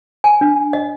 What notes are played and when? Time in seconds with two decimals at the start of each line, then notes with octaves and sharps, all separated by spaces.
0.24 G#5
0.41 D4
0.73 D#5